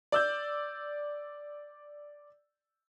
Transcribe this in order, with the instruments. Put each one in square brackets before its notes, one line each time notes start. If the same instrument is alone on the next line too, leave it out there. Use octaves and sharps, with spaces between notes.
[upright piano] D5 E6 G6